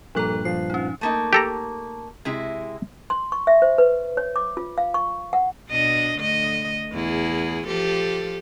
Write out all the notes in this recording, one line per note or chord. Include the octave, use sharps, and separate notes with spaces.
G2 A#2 F3 A4 A#5 F#6
F3 C7
C#4 D#4
A3 A#3 D#4
G4 A4 A#5
C3 G#3 E4
C6
C#6
E5
C5
B4
C#5
D6
F4
F5
C#6
F#5
B2 D4 D#5
D3 A3 D#5
E2 E4 G#4
F3 G4 A4